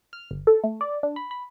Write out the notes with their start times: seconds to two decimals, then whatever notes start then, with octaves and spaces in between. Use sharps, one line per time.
0.13 F6
0.31 G1
0.47 A4
0.64 A3
0.81 D5
1.03 D4
1.16 B5
1.31 B5